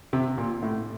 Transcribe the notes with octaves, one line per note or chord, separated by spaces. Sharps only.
C3
A#2
A2